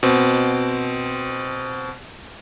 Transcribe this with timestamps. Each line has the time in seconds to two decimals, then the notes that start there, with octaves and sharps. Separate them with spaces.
0.03 B2 C4